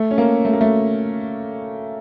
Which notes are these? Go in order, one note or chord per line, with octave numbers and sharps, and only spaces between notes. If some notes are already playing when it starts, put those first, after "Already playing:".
Already playing: A3
C#4
A#3
A3
A#3
A3